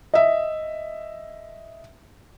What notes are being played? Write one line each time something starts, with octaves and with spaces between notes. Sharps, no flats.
D#5 E5